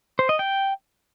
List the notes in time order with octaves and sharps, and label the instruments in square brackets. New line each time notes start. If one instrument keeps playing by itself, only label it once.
[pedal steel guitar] C5
D#5
G5